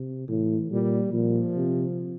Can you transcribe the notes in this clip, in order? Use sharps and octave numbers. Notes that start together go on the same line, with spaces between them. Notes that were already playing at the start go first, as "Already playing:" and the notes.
Already playing: C3
A2 E3
A#2 G3
A#2 F3
C3